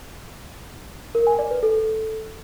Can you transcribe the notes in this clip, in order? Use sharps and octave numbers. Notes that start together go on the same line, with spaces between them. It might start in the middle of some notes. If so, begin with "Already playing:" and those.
A#4
G#5
D5
B4
A4